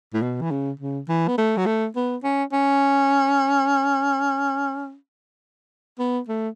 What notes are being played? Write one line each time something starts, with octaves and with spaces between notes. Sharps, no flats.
A2
B2
E3
C#3
C#3
E3
B3
A3
F#3
A3
B3
C#4
C#4
B3
A3